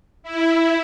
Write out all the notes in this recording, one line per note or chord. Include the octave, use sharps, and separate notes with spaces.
E4